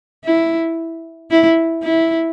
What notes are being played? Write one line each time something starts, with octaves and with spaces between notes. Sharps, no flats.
E4
E4
E4